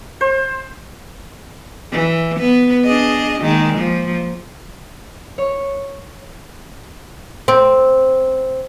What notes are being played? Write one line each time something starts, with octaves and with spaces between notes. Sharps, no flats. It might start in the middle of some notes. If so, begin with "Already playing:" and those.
C5
E3
B3 B4
D4 G#4 D#5
D#3 G#3 A#3
F3 A#3
C#5
C4